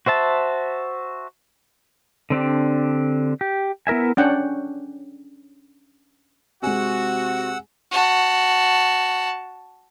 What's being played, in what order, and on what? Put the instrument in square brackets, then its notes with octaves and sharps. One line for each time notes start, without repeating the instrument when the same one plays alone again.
[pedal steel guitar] F#4 C5 E5 A5
D3 C4 D4 G4
G4
B3 E4 A#4 E5 G#5
[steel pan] C#4 D4 F#5 G5
[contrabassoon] C3 [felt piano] G#3 G#5 [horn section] F#4 [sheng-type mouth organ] F#5 E6
[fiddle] F#4 A5